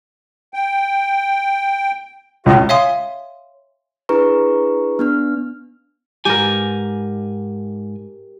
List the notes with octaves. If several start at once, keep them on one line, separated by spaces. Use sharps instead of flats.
G5
C#2 F4 F#4 D#5
C#5 E5 F5 G#5 C6 D#6
D4 E4 G#4 B4 A#5 C#6
B3 D4 F6
G#2 G4 A#4 G#5